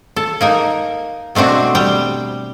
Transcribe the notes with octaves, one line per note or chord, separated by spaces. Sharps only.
A4
A#3 D#4 A#4
B2 A3 C4 D4 F#4
G3 G5